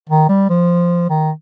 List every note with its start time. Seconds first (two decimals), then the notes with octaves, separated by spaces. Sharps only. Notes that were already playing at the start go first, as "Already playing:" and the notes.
0.09 D#3
0.29 G3
0.49 F3
1.10 D#3